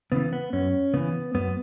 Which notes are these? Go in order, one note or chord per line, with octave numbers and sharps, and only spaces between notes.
C#3 E3 B3
B3
F#2 C#4
C#3 E3 B3
F#2 B3